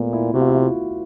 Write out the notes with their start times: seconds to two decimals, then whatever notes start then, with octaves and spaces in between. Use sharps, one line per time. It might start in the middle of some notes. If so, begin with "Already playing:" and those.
Already playing: A#2 A3 B3
0.13 E4
0.34 C3 F#4
0.41 F4
0.49 E4
0.56 F4